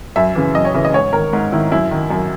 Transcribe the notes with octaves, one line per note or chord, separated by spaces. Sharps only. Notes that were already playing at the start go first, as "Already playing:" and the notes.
F#2 E5
C#3 E3
F#2 D#5
C#5
C#3 E3 E5
D#5
G#2 C#5
D#3 A#4
G#2
D#3 E4
F#2 E4
D#3
F#2